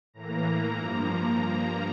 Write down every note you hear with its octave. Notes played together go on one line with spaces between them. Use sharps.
A2 E3 A#3 A#5
A#5
G2 F3 A#3
G2 F3 A#3 A#5